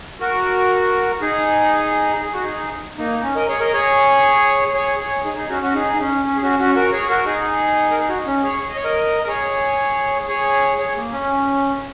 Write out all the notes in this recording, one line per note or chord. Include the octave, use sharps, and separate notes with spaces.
F#4 A#4
D#4 G#4
G#4
F#4
D#4 G#4
A#3 D#4
C#4
A#4 D#5
G#4 C#5
A#4 D#5
G#4 C#5
G#4 C#5
G#4 C#5
D#4 G#4
D#4 G#4
C#4 F#4
C#4 F#4
D#4 G#4
D#4
C#4
C#4
G#4
C#4 F#4
C#4 F#4
F#4 A#4
G#4 C#5
F#4 A#4
D#4 G#4
A#4
G#4
F#4
D#4
C#4
G#4 C#5
D#5
C#5
A#4 D#5
A#4
G#4 C#5
G#4 C#5
G#4 C#5
A#3
C#4